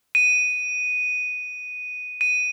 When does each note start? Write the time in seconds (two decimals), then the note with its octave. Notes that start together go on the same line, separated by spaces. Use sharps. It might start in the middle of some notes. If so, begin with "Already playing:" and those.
0.15 D#7
2.21 D#7